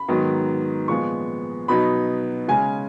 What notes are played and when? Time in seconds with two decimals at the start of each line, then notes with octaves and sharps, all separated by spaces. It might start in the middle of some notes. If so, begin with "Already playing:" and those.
Already playing: B5
0.09 G#2 D#3 F#3 B3
0.88 A#2 F3 G#3 B3 C#6
1.68 B2 F#3 B3 D#4 B5
2.48 C#3 G#3 C#4 G#5